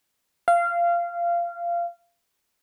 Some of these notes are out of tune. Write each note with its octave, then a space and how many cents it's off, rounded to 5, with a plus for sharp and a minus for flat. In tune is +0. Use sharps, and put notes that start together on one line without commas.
F5 -20